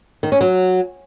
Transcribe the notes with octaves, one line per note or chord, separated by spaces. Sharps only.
D#3
C#4
F#3